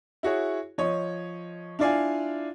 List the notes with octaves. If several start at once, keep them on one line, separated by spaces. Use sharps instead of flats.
E4 F#4 G#4 C#5
F3 C#5 D#5
D4 E4 F4 D5 F5 G#5